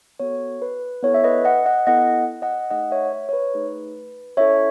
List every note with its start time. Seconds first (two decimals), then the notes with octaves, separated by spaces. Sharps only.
0.20 B3 F#4 A4 C#5
0.62 B4
1.03 B3 E4 A4 C#5
1.14 E5
1.24 B4 D#5
1.45 D#5 F#5
1.66 D#5 F#5
1.87 B3 E4 A4 D#5 F#5
2.42 D#5 F#5
2.70 A3 D#4 G#4 D#5 F#5
2.91 C#5 E5
3.12 C#5
3.29 C#5
3.33 B4
3.54 A3 D#4 G#4
4.37 C#4 E4 A4 C#5 E5